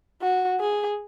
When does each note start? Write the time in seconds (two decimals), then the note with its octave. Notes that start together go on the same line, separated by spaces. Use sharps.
0.22 F#4
0.60 G#4